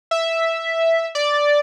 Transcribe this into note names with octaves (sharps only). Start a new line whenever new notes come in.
E5
D5